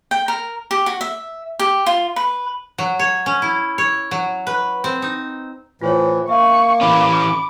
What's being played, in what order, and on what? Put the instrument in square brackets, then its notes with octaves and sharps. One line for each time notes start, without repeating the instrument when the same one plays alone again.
[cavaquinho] G5
A#4
G4
F#4
E5
G4
F4
B4
[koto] F#3
C#5
C#4
E4
C#5
F#3
B4
C4
D#4
[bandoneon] A2 E3 [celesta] F4 C5 C#5
[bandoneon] A#3 [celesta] E5 [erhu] C#6
[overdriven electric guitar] E3 C#4 [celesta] B5 [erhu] D6